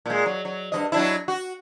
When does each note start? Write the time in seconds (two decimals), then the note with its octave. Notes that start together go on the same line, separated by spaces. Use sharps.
0.06 A#2 G#3
0.26 F#3
0.45 F#3
0.72 G2 F3 D#5
0.92 F#3 D4 E4
1.28 F#4